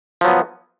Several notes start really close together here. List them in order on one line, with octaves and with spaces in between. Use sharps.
F3 F#3 B3